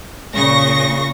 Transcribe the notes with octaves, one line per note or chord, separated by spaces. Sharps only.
A#2 C#3 C#6 A#6